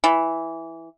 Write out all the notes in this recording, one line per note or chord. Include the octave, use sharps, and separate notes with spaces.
E3